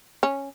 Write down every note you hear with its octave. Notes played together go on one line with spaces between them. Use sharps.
C#4